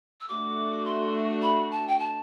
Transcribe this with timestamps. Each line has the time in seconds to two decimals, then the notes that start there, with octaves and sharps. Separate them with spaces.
0.21 E6
0.28 A3 D4 F#4 D6
0.85 C6
1.42 B5
1.71 A5
1.88 G5
1.99 A5